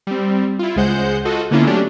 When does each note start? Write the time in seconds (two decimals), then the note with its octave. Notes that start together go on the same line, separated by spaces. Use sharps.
0.07 G3 C4
0.59 E4 F4
0.76 C#2 G#3 C5 F#5 G6
1.25 F4 F#4 A4 D#5
1.51 D3 A#3 B3 C#4 E4 F4
1.66 F#3 A3 C#4 D4 G4